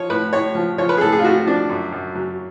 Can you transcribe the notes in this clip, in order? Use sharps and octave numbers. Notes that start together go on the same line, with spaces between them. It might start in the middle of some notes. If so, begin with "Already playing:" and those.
Already playing: F3 C#5
A2 B4
A2 C#5
F3
F3 C#5
B4
G#4
A2 A4
G#4
F4
A2 F#4
F3 D4
F#2
F#2
F#3